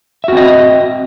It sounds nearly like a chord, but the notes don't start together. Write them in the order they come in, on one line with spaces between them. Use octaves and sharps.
E5 F#4 C4 D#5